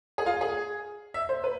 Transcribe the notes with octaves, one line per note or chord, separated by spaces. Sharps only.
G#4
F4
G#4
E5
C5
B4